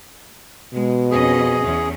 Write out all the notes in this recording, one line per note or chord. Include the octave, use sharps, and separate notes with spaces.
B2 G#3
F2 C#4 G#4 D#5
E2 C#4